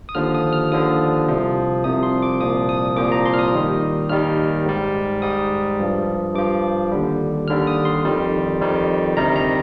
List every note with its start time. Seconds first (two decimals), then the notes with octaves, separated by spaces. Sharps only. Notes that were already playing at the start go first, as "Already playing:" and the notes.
0.09 D#6
0.15 D#2 D3 F3 F6
0.35 D#6
0.53 F6
0.71 D#2 D3 F3 D#6
1.28 C2 C3 F3
1.84 C2 C3 F3 D#6
2.03 C6
2.22 D6
2.40 C2 A#2 F3 D#6
2.69 D#6
2.96 C2 A#2 F3 D6
3.12 A#5
3.26 C6
3.34 F6
3.39 D#6
3.54 D#2 D#3 G3
4.09 D#2 D#3 G3 F6
4.66 G#2 G3
5.22 G#2 G3 D#6
5.79 G2 F3
6.35 G2 F3 D6
6.92 D#2 D3 G3
7.48 D#2 D3 G3 F6
7.67 D#6
7.85 C6
8.04 F2 D#3 G3
8.61 F2 D#3 G3
9.17 D2 C3 D#3 G3 A#5
9.36 A#5